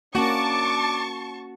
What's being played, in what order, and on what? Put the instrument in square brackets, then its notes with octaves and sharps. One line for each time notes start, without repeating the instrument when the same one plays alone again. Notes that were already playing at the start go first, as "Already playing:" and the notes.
[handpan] A#3 C#4 [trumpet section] D4 D6 [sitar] F#4 [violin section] A5 C#6